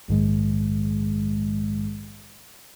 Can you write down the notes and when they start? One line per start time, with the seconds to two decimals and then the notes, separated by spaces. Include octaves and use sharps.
0.08 A#1 G#2 D#3 G#3